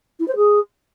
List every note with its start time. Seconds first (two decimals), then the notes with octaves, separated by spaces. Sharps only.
0.20 E4
0.28 C5
0.36 G#4